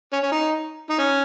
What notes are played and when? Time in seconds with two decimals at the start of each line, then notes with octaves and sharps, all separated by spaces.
0.13 C#4
0.23 C#4
0.32 D#4
0.90 D#4
0.99 C#4